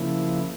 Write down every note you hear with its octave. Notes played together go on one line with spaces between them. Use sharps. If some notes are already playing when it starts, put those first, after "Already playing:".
Already playing: C#3 F3 A#3 E4